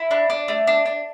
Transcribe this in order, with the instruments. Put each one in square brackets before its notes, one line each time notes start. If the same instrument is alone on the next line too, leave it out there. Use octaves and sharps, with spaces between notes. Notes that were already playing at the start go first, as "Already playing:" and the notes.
Already playing: [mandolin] E4
D4
D4
A3
D4
D4